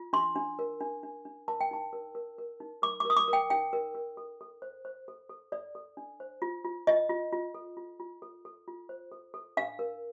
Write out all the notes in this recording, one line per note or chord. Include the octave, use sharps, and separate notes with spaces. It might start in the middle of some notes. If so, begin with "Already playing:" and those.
Already playing: F4
D4 C6
D4
A#4
D4
D4
D4
A#4 A5
G5
D#4 A5
A#4
A#4
A#4
D#4
A#4 D6
D6
A#4
D#6
D6
A#4
G5
D#4 G5
A#4
A#4
A4
A4
C5
C5
A4
A4
A4 D5
A4
D4
C5
F4
F4
F4 D#5
F4
F4
A4
F4
F4
A4
A4
F4
C5
A4
A4
D4 F5
A#4